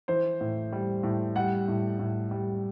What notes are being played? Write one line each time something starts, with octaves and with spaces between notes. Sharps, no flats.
E3 C5
A2
G3
A2
G3 F#5
A2
A2
G3